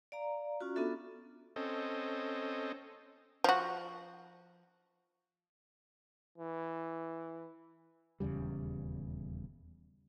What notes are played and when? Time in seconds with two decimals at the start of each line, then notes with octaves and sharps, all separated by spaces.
0.12 D5 F5 A#5
0.61 C#4 F4 F#4
0.76 B3 D4 F4 F#4 A4 E5
1.56 C4 C#4 A4 D#5
3.44 F3 F#4
6.38 E3
8.20 D#1 E2 C#3 G3